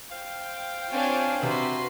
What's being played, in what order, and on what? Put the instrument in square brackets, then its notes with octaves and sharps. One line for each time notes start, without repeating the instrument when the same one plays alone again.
[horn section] C5 F5 G5
[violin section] C4 D4 F4 [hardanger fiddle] C#5 G#5
[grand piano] C3 [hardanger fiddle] F#4 C6 [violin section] B4